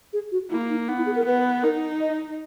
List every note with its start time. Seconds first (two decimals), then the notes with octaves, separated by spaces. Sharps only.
0.13 G#4
0.32 F#4
0.51 A#3 E4
0.70 D#4
0.88 B3 D#4
0.97 E4
1.06 G#4
1.16 A#4
1.26 B3 B4
1.63 D#4 A#4
2.00 D#5